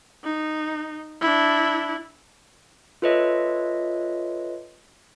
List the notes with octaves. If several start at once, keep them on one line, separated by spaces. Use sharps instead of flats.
D#4
D4 E4
F4 A4 B4 C#5 D#5 E5